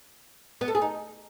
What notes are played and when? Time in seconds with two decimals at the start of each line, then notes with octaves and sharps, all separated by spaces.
0.61 B3
0.68 A4
0.75 G#4
0.82 D#4